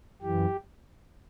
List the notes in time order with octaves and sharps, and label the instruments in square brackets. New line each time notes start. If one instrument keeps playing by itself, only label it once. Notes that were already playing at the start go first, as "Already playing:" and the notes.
[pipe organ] F#2 E3 G4